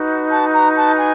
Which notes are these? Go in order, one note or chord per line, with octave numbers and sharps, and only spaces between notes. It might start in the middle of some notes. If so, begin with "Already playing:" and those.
Already playing: D#4 F#4 B4
A5
A#5
A5
G#5